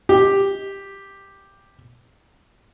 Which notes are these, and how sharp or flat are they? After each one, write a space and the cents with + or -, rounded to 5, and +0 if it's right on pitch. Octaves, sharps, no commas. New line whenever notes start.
G4 +5